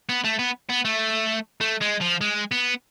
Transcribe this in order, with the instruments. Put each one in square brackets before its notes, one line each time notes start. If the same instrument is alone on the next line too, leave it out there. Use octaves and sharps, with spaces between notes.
[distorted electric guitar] B3
A3
B3
B3
A3
A3
G#3
F3
G#3
B3